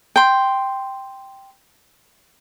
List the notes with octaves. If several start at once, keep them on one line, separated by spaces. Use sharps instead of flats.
G5 C6